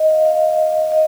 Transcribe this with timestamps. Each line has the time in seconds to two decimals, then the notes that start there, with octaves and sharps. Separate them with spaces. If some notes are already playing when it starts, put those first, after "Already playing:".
Already playing: D#5
0.09 F5
0.25 F5
0.82 F5
0.92 D#5